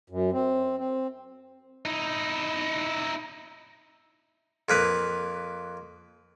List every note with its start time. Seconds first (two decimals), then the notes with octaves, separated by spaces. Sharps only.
0.10 F#2
0.33 C4
0.78 C4
1.85 D#4 E4
4.69 F2 A#3 B4